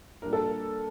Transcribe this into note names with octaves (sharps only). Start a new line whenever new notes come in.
A#2 G3 D4 A#4
A4